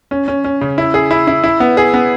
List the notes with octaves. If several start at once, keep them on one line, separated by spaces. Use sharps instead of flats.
C#4
C#4
C#4
C#3
E4
G#4
E4
E4
E4
B3
G#4
B3